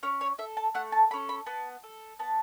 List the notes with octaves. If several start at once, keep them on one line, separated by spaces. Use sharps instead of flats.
C#4 C#5
C#5
A4 E5
A5
A3 F#5
A5
C#4 A4 B5
B5
B3 A5
A4
B3 A5